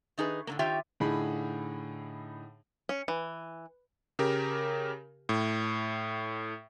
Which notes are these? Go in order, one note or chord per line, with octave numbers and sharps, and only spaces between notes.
D#3 D#4 G#4 B4
A2 D3 A#3
D#3 F4 G4 C#5 E5 G5
A2 D3 D#4 G#4 B5
C#4
E3
C#3 G4 A#4
A2